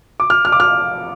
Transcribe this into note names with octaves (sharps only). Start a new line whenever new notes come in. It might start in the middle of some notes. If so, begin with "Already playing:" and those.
D6
F6
F6
D6
F6